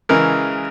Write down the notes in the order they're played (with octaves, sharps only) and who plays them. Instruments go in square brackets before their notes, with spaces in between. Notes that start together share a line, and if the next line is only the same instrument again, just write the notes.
[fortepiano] C#3 E3 G#3 A#4